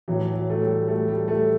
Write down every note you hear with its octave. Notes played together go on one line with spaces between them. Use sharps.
A2 E3 F#3
F#3
A3
G3
A3
G3
A3